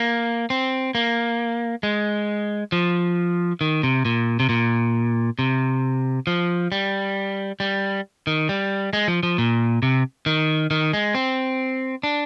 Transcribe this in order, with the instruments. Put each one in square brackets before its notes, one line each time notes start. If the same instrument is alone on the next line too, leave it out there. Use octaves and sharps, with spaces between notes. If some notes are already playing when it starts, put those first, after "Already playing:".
Already playing: [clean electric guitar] A#3
C4
A#3
G#3
F3
D#3
C3
A#2
C3
A#2
C3
F3
G3
G3
D#3
G3
G#3
F3
F3
A#2
C3
D#3
D#3
G#3
C4
D4